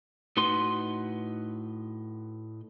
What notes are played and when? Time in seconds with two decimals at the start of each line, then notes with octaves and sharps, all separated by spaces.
0.37 A2 D#4 F#4 B4 C6